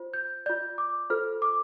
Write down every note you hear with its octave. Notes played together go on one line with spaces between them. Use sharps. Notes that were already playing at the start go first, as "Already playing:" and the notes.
Already playing: F4 C5
G6
F4 D5 G6
D6
F4 A4 C5 F6
D6